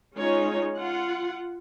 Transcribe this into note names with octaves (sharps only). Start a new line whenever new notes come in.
G#3 C#4 D#4 F4 C#5
F4 F#5